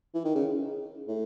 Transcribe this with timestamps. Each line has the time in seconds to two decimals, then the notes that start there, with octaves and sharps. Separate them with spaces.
0.14 E3
0.25 D#3
0.35 C#3
1.08 A2